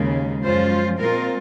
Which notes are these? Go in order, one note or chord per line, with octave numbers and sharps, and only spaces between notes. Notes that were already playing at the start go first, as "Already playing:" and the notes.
Already playing: D#2 C#3 G#3
F#2 F3 G#3 C#4 F4 C5
C5
A#2 G#3 C4 F4 A#4